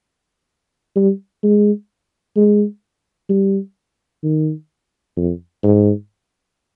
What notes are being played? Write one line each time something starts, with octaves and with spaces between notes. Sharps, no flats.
G3
G#3
G#3
G3
D#3
F2
G#2